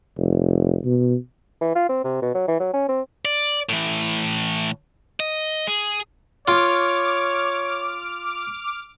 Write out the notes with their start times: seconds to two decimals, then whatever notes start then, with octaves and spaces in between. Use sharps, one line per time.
0.17 F1
0.85 B2
1.61 E3
1.75 F4
1.89 C4
2.04 C3
2.22 B2
2.35 F#3
2.48 E3
2.60 F#3
2.74 C#4
2.89 C4
3.25 D5
3.69 A2 E3
5.20 D#5
5.67 G#4
6.48 F4 C#5 D6 F6